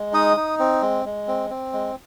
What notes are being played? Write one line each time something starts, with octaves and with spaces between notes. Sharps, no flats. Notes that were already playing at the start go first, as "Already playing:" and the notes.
Already playing: G#3
D#4 D#6
D#4
C4
G#3
G#3
C4
C4
G#3